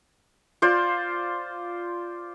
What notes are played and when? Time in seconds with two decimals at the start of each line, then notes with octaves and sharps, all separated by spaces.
0.62 F4 C5 D5